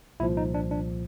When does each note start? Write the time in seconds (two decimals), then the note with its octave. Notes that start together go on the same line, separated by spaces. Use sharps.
0.20 C2 A#2 F3 E4
0.37 D#4
0.54 D4
0.71 D4